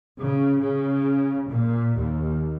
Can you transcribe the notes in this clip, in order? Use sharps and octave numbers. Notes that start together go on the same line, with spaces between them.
C#3
C#3
A#2
D#2